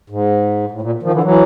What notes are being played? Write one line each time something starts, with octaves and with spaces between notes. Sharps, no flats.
G#2
A2
A#2
D#3 F3
D3 E3
E3 F#3